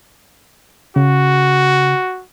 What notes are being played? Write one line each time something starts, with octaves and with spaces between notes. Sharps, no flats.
C#3 F#4